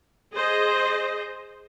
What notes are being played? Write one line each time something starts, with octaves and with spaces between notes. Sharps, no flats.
G#4 C5 D#5